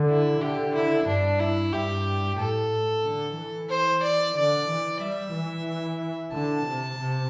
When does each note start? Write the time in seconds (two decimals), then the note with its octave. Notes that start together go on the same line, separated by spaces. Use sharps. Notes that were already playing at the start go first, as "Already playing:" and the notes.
Already playing: D3
0.09 E4
0.41 D3 G4
0.75 E4
1.07 G2 D4
1.40 E4
1.72 G2 G4
2.38 A2 A4
3.05 D3
3.37 E3
3.69 C5
4.03 D5
4.36 D3 D5
4.68 E3
5.01 G3 E5
5.34 E3
6.33 D3 A5
6.65 C3
6.98 C3